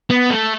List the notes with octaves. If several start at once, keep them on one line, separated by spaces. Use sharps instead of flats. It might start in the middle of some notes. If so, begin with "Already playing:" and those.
B3
A3